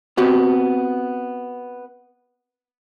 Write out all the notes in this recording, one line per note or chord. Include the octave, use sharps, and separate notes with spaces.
B3 C4 F#4 G4